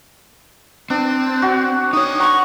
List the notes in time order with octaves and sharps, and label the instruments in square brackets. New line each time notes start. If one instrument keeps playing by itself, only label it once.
[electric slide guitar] C4 [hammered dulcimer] D4
[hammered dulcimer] F#4
[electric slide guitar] D#4 C#5 [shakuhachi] D#6
[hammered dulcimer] F#5 A#5 [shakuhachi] C#6